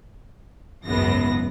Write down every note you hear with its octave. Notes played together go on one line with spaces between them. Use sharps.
G#1 C#2 F#2 C#3 B3 A#6